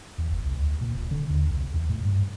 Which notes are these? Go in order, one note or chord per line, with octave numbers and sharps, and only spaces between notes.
E2
G1
C2
D2
A#2
D1
D3
D#2
C2
E2
A2
G2